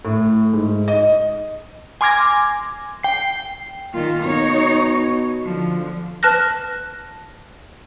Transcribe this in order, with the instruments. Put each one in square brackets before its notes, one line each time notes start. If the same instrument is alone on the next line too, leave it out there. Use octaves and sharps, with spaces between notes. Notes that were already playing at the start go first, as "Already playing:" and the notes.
[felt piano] A2
G#2
D#5
[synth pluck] G#5 C6 D6 F6 G#6 A#6
G5 C7
[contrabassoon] A#2 [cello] D#3 F4
[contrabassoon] B2 [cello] D#4 C#5
[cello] D3 F3
[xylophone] B4 A5 F6 F#6 A#6